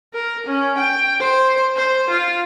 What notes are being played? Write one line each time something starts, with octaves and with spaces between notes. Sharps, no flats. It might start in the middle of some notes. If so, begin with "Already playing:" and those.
A#4
C#4
G5
C5
C5
F4